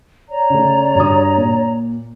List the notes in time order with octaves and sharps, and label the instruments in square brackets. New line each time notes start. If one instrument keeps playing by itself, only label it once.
[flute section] C#5 D5 A#5
[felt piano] C#3 A3
G2 F#4 D#6
A#2